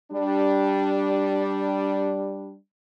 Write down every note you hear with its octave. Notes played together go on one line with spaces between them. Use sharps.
G3 D4